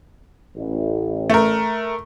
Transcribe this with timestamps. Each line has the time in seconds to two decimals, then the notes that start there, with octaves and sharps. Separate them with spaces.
0.56 A1
1.30 A3 A#4